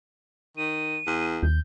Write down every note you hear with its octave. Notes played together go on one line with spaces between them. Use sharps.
D#3 D#7
E2
D#2 G6